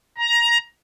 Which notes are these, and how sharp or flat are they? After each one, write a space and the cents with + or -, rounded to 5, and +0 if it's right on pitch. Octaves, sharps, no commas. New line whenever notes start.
A#5 +15